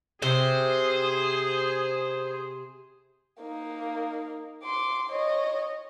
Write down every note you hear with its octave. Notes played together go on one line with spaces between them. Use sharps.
C3 G#4 C5
A#3 D#4
C6 D6
C#5 D#5